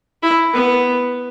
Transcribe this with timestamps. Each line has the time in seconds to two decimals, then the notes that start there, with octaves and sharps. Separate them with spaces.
0.23 E4
0.54 B3